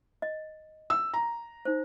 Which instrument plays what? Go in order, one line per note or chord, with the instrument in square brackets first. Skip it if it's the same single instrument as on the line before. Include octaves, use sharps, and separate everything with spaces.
[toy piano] D#5
[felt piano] E6
A#5
[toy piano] D#4 C5